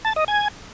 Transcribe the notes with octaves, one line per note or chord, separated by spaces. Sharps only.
A5
D#5
G#5